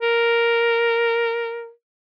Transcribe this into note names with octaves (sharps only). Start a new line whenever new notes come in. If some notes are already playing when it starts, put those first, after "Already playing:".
A#4